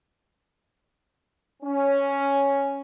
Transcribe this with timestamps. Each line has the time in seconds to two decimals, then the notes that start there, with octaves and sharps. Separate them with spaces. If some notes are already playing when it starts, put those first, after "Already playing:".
1.63 C#4